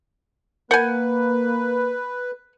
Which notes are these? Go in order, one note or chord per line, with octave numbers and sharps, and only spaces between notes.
A#3 A#4 B4 F#5 G#5 G6